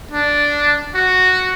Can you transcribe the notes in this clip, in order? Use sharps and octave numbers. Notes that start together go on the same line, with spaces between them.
D4
F#4